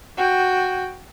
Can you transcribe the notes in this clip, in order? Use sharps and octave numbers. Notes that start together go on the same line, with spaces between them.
F#4 G5